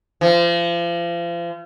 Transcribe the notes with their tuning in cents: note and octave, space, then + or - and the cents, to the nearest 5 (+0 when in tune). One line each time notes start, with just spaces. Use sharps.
F3 -35